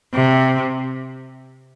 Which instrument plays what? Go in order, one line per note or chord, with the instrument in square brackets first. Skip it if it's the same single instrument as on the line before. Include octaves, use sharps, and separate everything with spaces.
[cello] C3